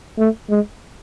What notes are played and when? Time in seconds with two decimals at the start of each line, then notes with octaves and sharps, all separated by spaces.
0.19 A3
0.50 G#3